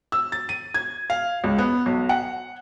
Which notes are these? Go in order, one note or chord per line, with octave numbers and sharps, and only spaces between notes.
E6
A6
D#7
G#6
F5
C#2
B3
B1
F#5